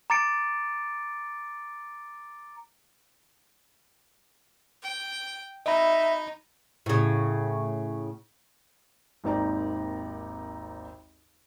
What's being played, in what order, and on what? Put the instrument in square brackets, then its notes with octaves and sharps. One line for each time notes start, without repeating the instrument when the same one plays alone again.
[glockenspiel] A#5 D6 A6 C#7 D7
[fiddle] G5
[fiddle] D#4 [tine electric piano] D#5 B5 [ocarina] E5
[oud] A2 C#3
[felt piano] G#1 D#2 C4 D#4 D5 A#5